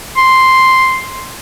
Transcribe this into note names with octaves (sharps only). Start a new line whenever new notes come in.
C6